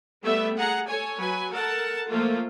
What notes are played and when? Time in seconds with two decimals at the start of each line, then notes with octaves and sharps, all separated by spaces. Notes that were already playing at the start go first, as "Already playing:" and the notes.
0.24 G3 A3 B3 E5 G5
0.57 G#4 F#5 A#5
0.87 A4 C#5 G#5
1.18 F#3 B4 G#5
1.51 A4 A#4 F#5 A5
2.09 F3 A3 A#3 F4